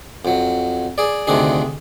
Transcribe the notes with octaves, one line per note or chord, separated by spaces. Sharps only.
F2 F#3
G#4 D5
D2 C3 D#3 D4 G#4